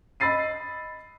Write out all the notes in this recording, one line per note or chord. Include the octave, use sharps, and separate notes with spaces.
D#5 B5 E6 A6 C7 D#7